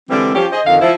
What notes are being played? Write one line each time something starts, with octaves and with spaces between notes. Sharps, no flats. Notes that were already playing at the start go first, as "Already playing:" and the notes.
D3 E3 G3 G#3 C4
F3 C#4 G4
G#4 C5 D#5
F2 D3 D#3 F5
F3 E4